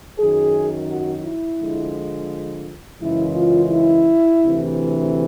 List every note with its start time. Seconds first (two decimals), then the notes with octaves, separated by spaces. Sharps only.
0.19 F#2 D#3 F#3 G#4
0.89 F#4
1.25 E4
1.60 D3 F3 G#3
3.00 F#2 C#3 E3 G#3 E4
3.36 F4
3.71 E4
4.42 D2 C3 E3